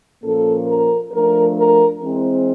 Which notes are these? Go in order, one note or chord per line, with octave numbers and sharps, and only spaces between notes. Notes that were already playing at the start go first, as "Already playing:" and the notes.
A#2 F3 A#3 C#4 A4
A#4
F3 A3 D4 A#4
A#4
E3 G#3 C4